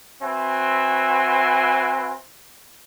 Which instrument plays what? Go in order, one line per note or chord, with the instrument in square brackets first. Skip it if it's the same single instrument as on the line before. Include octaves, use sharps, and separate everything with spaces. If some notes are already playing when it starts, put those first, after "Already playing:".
[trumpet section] C4 F#4 B4 E5 G#5 C6